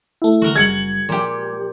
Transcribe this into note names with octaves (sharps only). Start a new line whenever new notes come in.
A3 E4
D3 G#3 F#4 A#4
F#1 G3 G#3 G#6 C#7 F#7
A#2 F3 G4